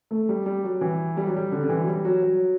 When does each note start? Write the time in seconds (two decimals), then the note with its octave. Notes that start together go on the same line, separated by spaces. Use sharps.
0.11 A3
0.29 G3
0.46 G3
0.64 F#3
0.81 E3
1.17 G3
1.26 F#3
1.36 G3
1.52 D3
1.64 D3
1.69 E3
1.81 F#3
1.88 G3
2.05 F#3
2.22 F#3